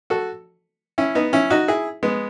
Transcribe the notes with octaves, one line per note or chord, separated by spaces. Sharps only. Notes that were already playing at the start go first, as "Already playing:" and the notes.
F#4 A4
C#4 E4
B3 D#4
C#4 E4
D#4 F#4
E4 G#4
G#3 B3